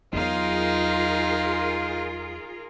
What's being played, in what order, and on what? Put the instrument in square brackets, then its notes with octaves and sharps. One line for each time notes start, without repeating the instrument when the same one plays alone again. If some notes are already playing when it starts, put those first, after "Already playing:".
[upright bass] E2 F#3 [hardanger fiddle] D#4 F5 [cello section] F4 G#4 A#4